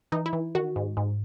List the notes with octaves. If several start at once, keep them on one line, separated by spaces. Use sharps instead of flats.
E3 D#4
E4
E3
D#3 F#4
G#2
G#2